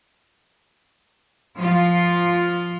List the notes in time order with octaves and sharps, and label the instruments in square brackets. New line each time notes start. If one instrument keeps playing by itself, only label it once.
[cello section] F3 F4